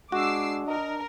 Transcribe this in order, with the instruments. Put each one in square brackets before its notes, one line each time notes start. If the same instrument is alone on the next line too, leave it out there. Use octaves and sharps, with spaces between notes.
[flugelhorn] G#3 [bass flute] D4 [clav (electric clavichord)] F#4 [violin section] D6 E6 C7
[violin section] A#4 [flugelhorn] D#5